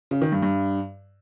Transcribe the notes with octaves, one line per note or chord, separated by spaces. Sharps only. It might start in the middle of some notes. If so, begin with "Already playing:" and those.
C#3
D#3
G2
G2